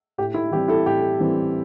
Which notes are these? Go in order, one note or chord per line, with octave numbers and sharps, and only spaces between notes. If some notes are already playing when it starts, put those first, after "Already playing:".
A2 G4
E4
E3 G3 C4 G4
E4 A4
A2 G4
E3 G3 C4